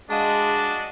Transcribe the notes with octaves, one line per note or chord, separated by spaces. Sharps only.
G#3 D4 F#4 D#5 F5 A5